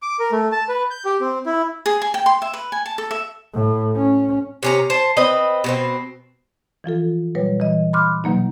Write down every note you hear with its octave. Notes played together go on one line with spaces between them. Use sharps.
D6
A#4
A3
A5
B4
G6
G4
C4
E4
G#4
G#5
G5
C6
E5
B4
G#5
A5
A4
E5
A2
C#4
C3 C#4 A#5
C5 A5
C4 B4 D#5
B2 B3 C4
E3 F3 F4 A4
A#2 F#3 G3 B4 C#5
E3 D#5
B5 C6 D6 F6 F#6
B2 D#3 F#3 A#3 D#4